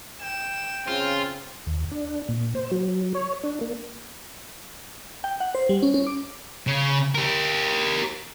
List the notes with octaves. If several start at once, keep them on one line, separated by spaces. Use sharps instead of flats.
G5 E7
C#3 C4 F4
D#2
D4
A#2
C5
F#3
C#5
D4
A#3
G5
F#5
C5
G3
C#4
C#4
D6
C#3
G4 A#4